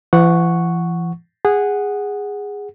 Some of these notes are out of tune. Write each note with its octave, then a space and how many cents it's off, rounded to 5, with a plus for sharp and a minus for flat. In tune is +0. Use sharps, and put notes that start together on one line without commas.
E3 +45 F#5 +0 C#6 +0
G#4 -15 F#5 +0